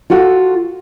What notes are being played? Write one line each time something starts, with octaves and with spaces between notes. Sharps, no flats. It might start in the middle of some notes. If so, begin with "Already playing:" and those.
F4 F#4 A4 F#5